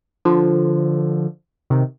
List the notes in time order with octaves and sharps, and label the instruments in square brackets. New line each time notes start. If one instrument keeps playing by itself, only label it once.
[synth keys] D3 F3
C3 D#3